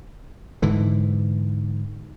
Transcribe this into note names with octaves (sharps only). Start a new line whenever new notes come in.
G#2 D3 E3